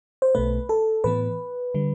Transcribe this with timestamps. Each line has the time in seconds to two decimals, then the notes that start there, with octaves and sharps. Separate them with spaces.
0.22 C5
0.35 B1 B2 A3 B4
0.69 A4
1.04 A2 E3 B3 B4
1.74 D3 G3